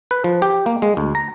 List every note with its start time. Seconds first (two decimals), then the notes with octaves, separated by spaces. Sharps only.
0.11 B4
0.24 F3
0.42 G4
0.66 A#3
0.82 G#3
0.97 D2
1.15 A#5